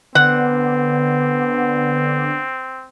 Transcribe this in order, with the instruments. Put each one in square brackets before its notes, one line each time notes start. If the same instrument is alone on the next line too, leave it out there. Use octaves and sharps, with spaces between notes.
[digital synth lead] D3 [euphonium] B3 [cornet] C4 [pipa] F#5